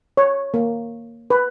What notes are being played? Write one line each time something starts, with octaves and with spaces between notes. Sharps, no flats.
C#5
A#3
B4